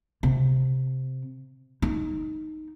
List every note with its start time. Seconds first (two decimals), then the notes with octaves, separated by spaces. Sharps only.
0.23 C3
1.82 D#4